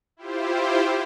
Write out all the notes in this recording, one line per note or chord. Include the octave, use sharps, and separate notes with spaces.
E4 F4 G4 C5